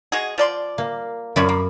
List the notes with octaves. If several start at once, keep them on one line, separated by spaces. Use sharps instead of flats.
G#3 F#4 G#4
F3 D5 C6
A#3
F#2 F3 C#5 D5 B5
A#3